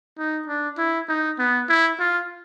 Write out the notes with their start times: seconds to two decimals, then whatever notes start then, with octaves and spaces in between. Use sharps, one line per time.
0.18 D#4
0.48 D4
0.78 E4
1.09 D#4
1.39 B3
1.69 E4
2.00 F4